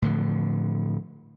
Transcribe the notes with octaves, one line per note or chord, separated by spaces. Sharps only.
A2 D3 F3